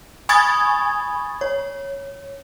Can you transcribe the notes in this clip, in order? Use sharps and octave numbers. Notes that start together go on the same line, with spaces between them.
G#5 B5 C#6 D#6 G#6 A6
C#5